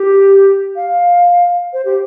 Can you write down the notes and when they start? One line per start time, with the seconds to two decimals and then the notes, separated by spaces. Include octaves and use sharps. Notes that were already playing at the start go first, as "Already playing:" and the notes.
Already playing: G4
0.76 F5
1.73 C5
1.85 G4